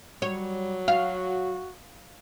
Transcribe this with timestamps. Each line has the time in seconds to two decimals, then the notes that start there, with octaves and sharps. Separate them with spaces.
0.22 F#3 G3 C#5
0.88 F#4 F5